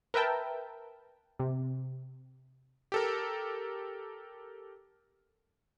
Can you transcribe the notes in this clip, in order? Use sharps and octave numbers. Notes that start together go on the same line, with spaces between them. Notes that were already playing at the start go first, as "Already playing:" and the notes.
A#4 B4 E5 G5 A5
C3
G4 A4 A#4